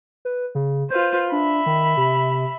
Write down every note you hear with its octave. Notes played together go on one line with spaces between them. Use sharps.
B4
C#3
F4 B4 C5 G6
D4 E5 B5
D#3
C3